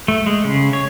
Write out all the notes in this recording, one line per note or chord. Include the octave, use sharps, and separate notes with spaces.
A3
G#3
C#3
C#5